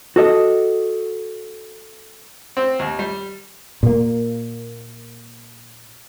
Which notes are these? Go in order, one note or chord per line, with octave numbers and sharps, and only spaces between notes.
F#4 A4 D#5
C4
D#2
G3
A#2 A#3